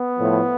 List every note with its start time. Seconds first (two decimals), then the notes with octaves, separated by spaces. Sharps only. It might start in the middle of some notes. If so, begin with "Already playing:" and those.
Already playing: B3
0.19 A2 F3